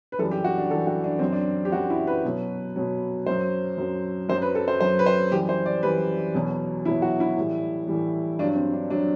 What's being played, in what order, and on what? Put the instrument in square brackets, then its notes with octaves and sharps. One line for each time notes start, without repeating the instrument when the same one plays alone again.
[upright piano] B4
F#2 E3 G3 A4
G4
F#4
D4
F#2 E3 G3 A4
F#4
D4
F#2 F#3 C4
D4
G4
F#2 F#3 F#4
E4
B4
B2 F#3
B2 F#3
F#2 F#3 C5
F#2 F#3
F#2 F#3 C5
B4
A4
C5
F#2 F#3 C5
B4
C5
F#2 E3 G3 G4
C5
D5
F#2 E3 G3 B4
E2 B2 F#3
E2 B2 F#3 E4
F#4
E4
A2 E3 G3
A2 E3 G3
G2 D4
F#3
C4
D4
F#3 D4